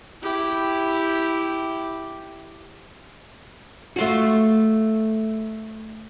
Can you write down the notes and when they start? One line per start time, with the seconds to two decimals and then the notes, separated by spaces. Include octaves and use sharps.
0.22 E4 G4
3.96 A3 F4 F#4